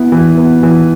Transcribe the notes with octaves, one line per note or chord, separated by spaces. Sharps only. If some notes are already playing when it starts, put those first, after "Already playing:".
Already playing: B3 E4
E3
B3
E3